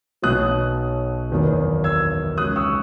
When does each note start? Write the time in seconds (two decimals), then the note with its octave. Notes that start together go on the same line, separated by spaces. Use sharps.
0.22 B1 B2 F#3 D#6 F#6
1.30 F#1 E2 D#3 F#3
1.84 E6 G#6
2.38 C#2 C#3 F#3 D#6 F#6
2.56 C#6 E6